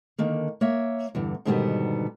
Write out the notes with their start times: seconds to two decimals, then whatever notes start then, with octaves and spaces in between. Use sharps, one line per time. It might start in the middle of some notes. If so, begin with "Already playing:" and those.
0.18 D3 D#3 A#3
0.61 A#3 C#5 E5
1.15 E2 G2 D3
1.45 G#2 B2 D3 D#3 G3 B3